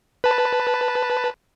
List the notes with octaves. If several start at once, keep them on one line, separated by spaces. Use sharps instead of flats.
B4 A5